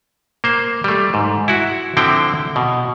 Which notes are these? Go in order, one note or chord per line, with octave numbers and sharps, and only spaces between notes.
A#3 C5
G3 A3
G#2
E4 F#4
D3 F3 C4 E4 G5
B2